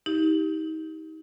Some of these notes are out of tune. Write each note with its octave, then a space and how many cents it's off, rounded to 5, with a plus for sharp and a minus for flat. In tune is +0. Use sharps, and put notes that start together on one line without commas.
D#4 +30 G4 +0